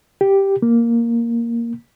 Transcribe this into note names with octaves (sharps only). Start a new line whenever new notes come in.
G4
A#3